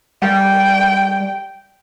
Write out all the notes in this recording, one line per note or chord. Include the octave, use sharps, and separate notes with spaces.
G3 G5